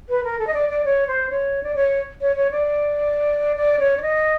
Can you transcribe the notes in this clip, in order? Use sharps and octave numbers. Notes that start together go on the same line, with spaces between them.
B4
A#4
A4
D#5
D5
D5
C#5
C5
C#5
D5
C#5
C#5
C#5
D5
D5
C#5
D5
D#5